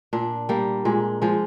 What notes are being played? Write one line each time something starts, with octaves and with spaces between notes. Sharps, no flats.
A#2 D4
G3 A#3
A#2 G#3
F3 G#3